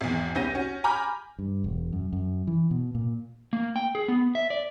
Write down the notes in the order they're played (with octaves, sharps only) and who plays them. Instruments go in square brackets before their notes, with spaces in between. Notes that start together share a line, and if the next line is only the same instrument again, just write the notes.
[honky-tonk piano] G#1 E2
C2 B3 C#4 G6 A#6 D#7
C#4 F#4
G#5 A#5 B5 D6 F6 G6
[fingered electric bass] G2
E1
F#2
F#2
E3
B2
A#2
[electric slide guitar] A#3
G5
G#4
B3
E5
D5